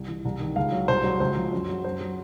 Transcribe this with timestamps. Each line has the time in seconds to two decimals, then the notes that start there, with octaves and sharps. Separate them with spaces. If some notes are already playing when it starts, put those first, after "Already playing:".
Already playing: C2
0.08 E3
0.25 C2
0.40 D#3
0.56 C#2 F5
0.72 F#3
0.88 C2 C5
1.04 F#3
1.20 C#2 C5
1.37 F3
1.52 F#2
1.68 F#3
1.84 F#2 C5
2.01 F#3